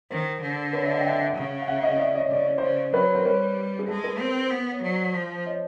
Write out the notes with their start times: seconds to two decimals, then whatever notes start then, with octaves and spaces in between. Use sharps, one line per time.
0.10 D#3 A#4 C5
0.42 D3
0.73 B4 C#5
0.84 D5 E5
0.94 D#5 F5
1.00 G5
1.05 E5 F#5
1.20 E5 F#5
1.36 C#3
1.62 F5
1.68 E5 F#5
1.83 D#5 F5
1.99 D5 E5
2.15 C#5 D#5
2.31 C#3 D5
2.45 C#5
2.58 C#3 C5 D5
2.94 F#3 B4 C#5
3.15 A#4 C5
3.25 G3 B4 C#5
3.79 G#4
3.88 G#3 A4
4.04 A4 B4
4.19 C4 A#4 C5
4.51 B3
4.71 C#5
4.83 F#3 C5 D5
5.14 F3
5.46 C#5 D#5